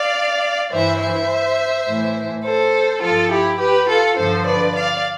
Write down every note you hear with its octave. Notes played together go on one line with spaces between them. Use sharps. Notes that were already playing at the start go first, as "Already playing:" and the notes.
Already playing: D5 F5
G2 E3 C5 E5
C5 E5
A2 E3
A4 C5
G2 F3 F4 A4
E4 G4
G4 B4
F4 A4
G2 D3 F3 A4 C5
B4 D5
D5 F5